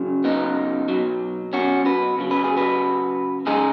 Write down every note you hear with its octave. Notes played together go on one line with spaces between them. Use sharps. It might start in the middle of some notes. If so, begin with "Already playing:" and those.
Already playing: C#3 F#3
B3 D#4
B2 F#3
C#4 F#4
F#4 B4
C#3 F#3
B4
G#4
F#4 B4
C#3 G#3 D#4 G#4